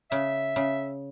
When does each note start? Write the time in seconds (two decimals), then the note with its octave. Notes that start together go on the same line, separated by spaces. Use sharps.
0.11 C#3 E5
0.56 C#3